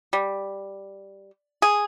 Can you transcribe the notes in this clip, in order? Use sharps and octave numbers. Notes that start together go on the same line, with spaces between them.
G3
G#4